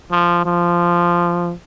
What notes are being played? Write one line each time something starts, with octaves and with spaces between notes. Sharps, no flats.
F3
F3